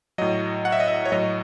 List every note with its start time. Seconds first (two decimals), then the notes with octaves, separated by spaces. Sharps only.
0.18 A2 F#3 D#5
0.65 F#5
0.72 E5
0.80 D#5
0.88 E5
1.05 C#5
1.12 A2 F#3 D#5